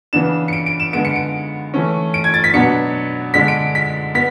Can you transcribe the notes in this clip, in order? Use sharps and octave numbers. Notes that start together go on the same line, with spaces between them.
C#3 E3 B3 D4 E7
C#7
D7
D7
E7
D3 G#3 B3 D7
C#7
D7
E3 A3 C#4
D7
G#6
A6
B6
B2 F#3 B3 D4 C#7
D3 G#3 D4 B6
D7
B6
B3 B6